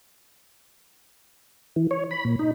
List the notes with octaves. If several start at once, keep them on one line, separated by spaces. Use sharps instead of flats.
E3
C#5
B5
A#2
D#4